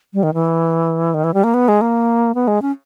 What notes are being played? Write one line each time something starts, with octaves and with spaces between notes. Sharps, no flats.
G3
D#3
E3
D#3
E3
G3
A#3
B3
G#3
A#3
B3
G#3
C#4